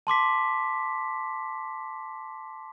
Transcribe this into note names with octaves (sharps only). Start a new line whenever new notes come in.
A5 C6 D6 B6